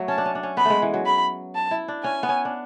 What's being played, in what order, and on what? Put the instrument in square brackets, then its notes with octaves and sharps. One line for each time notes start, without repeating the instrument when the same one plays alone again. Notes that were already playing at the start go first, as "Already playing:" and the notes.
Already playing: [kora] F#3 A3
[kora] C#4 [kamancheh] A5
[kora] D4
C#4
D4
C#4
[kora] B3 [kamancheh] B5
[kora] G#3 A3
E3
F#3
[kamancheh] B5
A5
[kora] E4
D4
[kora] C#4 [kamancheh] G#5
[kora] B3
C#4
D4